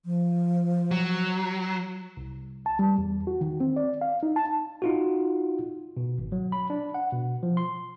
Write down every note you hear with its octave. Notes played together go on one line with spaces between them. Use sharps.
F3
F#3
C2
A5
G3
E2
F#4
D#3
C4
D5
F5
D#4
A5
D#4 F4 F#4
B2
G#1
F#3
B5
D4
F#5
B2
F3
C6